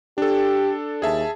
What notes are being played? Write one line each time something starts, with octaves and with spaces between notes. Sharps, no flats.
D4 G4 A4
D#2 G#4 E5 A5